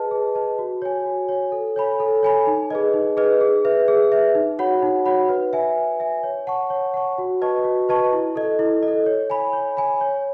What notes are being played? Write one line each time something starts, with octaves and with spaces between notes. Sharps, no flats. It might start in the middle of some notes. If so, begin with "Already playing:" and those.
Already playing: G#4 B4 D#5 A5
G#4
B4 D#5 A5
F#4
C#5 G#5
F#4
C#5 G#5
A4
C#5 G#5 B5
A4
C#5 G#5 B5
D#4
G#4 B4 D#5
D#4
G#4 B4 D#5
G#4
B4 E5
G#4
B4 E5
D#4
F#4 C#5 F#5 B5
D#4
F#4 C#5 F#5 B5
B4
E5 G#5
B4
E5 G#5
C#5
F#5 A5 C#6
C#5
F#5 A5 C#6
F#4
B4 D#5 A5 C#6
F#4
B4 D#5 A5 C#6
E4
A4 D#5
E4
D#5
A4
C#5
G#5 B5
C#5
G#5 B5
C#5